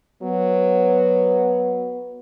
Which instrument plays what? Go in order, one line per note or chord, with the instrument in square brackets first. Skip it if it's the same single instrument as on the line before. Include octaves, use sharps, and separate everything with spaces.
[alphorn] F#3 [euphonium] B3